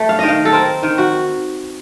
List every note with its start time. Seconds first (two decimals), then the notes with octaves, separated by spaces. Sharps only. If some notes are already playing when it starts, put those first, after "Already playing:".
Already playing: A3
0.09 F5
0.19 D#3 D#5
0.29 F5
0.45 A4
0.53 C4 A#4
0.83 D#3
0.98 F#4